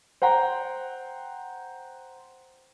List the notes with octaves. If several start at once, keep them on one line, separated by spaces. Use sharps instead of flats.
C5 F#5 G5 A#5